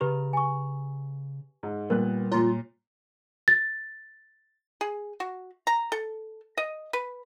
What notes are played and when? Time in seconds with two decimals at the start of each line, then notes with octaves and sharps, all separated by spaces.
0.01 C#3 G4 B4 A#5
0.33 G#5 C#6
1.63 G#2
1.90 A#2 G3 B3 A#4 F#6
2.32 A#2 F4 C#5 A#5
3.48 A6
4.81 G#4
5.20 F#4
5.67 A#5
5.92 A4
6.57 D#5
6.93 B4